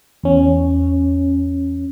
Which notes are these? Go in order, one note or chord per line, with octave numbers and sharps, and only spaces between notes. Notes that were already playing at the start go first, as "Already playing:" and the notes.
E2 C#4